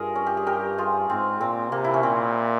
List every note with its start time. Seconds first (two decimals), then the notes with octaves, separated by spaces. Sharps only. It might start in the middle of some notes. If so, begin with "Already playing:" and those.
Already playing: G2 F4 G#4 A#4
0.15 C#4
0.27 G4
0.37 G#4
0.47 G4 A#4
0.78 F4 G#4
1.09 G#2 C4
1.41 A#2 C4
1.71 C3 A#3
1.84 E4
1.94 C#4
2.03 A#2 C4